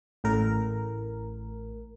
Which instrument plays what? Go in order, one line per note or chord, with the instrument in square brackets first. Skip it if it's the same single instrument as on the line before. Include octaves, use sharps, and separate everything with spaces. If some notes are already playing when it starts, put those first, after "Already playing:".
[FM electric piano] A1 A2 A#4